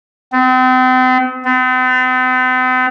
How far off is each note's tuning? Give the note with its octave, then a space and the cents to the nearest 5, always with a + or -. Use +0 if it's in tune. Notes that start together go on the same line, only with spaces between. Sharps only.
C4 -40
C4 -45